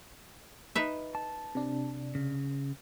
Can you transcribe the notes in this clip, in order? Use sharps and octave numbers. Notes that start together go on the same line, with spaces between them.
D#4 B4 E5
A5
C3 D4
C#3